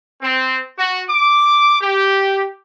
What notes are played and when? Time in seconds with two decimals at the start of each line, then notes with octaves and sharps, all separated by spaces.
0.22 C4
0.78 F#4
1.10 D6
1.81 G4